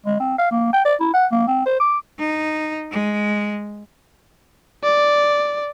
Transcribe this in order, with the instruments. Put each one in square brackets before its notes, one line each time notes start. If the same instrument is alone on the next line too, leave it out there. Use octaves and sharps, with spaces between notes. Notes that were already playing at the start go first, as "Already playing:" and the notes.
[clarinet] G#3
C4
F5
A#3
G5
D5
E4
F#5
A#3
C4
C5
D6
[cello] D#4
G#3
[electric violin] D5